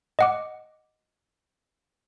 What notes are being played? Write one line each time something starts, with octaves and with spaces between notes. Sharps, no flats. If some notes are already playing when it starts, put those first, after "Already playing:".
D#5 F#5 D6